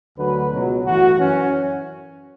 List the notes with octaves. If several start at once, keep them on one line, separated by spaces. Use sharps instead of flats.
D2 D3 F#3 B4
C#2 B2 F#3
A1 G2 E3 F#4
F#2 E3 C#4